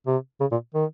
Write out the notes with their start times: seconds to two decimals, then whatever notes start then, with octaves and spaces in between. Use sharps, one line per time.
0.06 C3
0.40 C#3
0.52 A#2
0.74 D#3